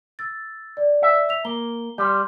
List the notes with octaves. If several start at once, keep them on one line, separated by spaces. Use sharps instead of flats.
E6 A6
D5
E5
E6 B6 F7
A#3 G7
G3 C6 F6 G6